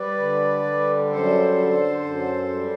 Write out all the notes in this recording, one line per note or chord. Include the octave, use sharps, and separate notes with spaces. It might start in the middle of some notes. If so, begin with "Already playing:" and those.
Already playing: G3 B4 D5
D3
G3
F#2 A4 C5
D3
F#2
G3